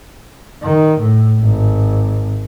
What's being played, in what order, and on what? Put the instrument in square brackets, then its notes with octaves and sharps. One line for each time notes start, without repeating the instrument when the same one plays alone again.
[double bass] D#3
A2
G#1